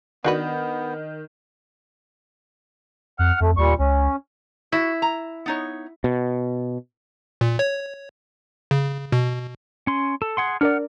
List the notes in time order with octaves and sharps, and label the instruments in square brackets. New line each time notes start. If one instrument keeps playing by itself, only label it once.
[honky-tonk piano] D#3 [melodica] B3 [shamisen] D4 F#4 B4
[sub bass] F2 [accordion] F#5 F6
[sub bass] F2 [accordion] A3
[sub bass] D#2 [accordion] A#2 G3 C#6
[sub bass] C#2 [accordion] C#4
[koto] E4 [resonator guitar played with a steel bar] F#4
[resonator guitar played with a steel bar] A#5
B3 D#4 C#5
[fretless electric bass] B2
[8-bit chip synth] A#2
C#5
C#3
B2
[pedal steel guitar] C#4 C6
A4
G#4 F#5 C6
[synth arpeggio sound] D4 A#4 D5 [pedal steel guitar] F#5 F6